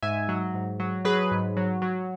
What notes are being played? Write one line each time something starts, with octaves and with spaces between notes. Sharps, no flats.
G#2 E5 G#5
F#3
G#2
F#3
F#3 G#4 B4
G#2
F#3
F#3